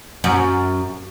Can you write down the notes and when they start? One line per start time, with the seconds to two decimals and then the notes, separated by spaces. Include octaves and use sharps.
0.24 F#2